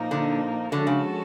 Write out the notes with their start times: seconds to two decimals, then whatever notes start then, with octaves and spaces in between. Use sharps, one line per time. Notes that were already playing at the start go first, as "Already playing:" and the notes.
Already playing: A#2 F3 A#3 D#4
0.11 D3
0.72 D3 F3 G#3 C#4 F#4 A4
0.87 C#3